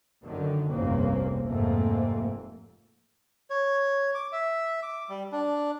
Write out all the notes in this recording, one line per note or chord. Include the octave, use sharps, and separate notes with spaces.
F#2 D3 D#3
F1 C2 G2 C#3 A#3 C4
F1 F2 G#2 A3 A#3 C4
C#5
D6
E5
D6
G3
D4